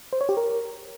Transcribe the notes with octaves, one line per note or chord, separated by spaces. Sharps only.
C5
C#5
G4
A#4